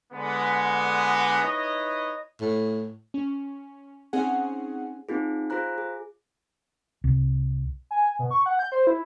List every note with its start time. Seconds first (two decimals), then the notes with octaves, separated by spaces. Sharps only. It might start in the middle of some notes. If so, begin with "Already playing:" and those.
0.13 D3 G#3 B3
1.41 D#4 E4 B4 C#5 D#5
2.41 A2
3.14 C#4
4.13 C4 C#4 D#4 G#4 F#5
5.09 C4 D#4 F4 G#4
5.50 F4 G#4 C5 A#5 F#6
5.78 G#4
7.04 C2
7.91 G#5
8.19 B2
8.31 C#6
8.46 F#5
8.59 G6
8.72 C5
8.87 E4